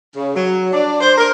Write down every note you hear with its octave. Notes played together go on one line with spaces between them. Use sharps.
C#3
F#3
D4
C5
A#4